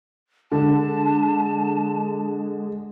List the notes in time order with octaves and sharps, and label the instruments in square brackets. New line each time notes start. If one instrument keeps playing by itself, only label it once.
[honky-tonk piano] D3 [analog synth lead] G#3 [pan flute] A5